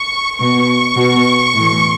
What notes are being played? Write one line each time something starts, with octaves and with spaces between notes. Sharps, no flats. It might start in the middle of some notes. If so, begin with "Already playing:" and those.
Already playing: C#6
B2 C#6
B2
A2 E3